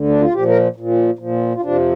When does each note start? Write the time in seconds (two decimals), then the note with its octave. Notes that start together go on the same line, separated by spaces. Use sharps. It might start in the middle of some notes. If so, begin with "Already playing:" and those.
Already playing: D2 D3
0.09 D4
0.21 F4
0.34 A#2 F3 G4
0.48 A#4
0.76 A#2 F3
1.19 A#2 F3
1.55 F4
1.62 F2 C3 F3 D4